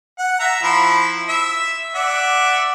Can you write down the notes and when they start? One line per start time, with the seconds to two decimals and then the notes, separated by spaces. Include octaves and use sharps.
0.18 F#5
0.40 E5 A#5
0.63 F3 E4 B5
1.29 E5
1.95 D5 E5 F#5